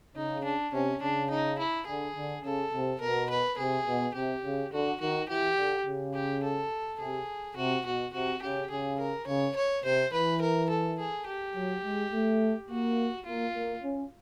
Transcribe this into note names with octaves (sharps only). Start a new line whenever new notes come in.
C#3 D#4
D4
C3 C#4
C#3 D4
D#4
E4
D3 G#4
D3
C#3 A4
C3
B2 A#4
B4
C3 G#4
B2
C3 G4
C#3
D3 F#4
D#3 F#4
E3 G4
D3
C#3
G4
A4
C3 G#4
C3 F#4
B2 F#4
C3 F#4
C#3 G4
C#3 G#4
A#4
C#3 C#5
C#5
C3 C5
E3 B4
A#4
A4
G#4
G4
F#3
G#3
A3
A#3 F#4
A#3 F4
A#3
C#4